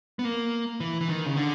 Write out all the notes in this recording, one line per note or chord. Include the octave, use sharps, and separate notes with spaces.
B3
A#3
E3
E3
D#3
C#3
D3